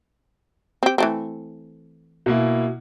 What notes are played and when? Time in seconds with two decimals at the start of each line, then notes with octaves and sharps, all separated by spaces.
0.83 C4 G4
0.98 E3 A3 C4
2.26 B2 A#3 E4